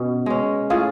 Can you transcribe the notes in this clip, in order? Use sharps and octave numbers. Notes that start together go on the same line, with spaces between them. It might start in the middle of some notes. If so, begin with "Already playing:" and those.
Already playing: B2 C#4
G#3 C#4
A2 F4 G#4